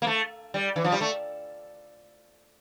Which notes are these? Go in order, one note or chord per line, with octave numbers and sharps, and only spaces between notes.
A#3
A3
G3
E3
F3
G3
A3